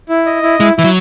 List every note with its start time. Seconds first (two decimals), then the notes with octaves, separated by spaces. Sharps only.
0.09 E4
0.26 D#5
0.43 E4
0.59 G#3 E4
0.77 E3 E4
0.84 F#3